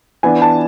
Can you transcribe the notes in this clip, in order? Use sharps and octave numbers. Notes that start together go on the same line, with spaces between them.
E3 B3 D4 G#5
A5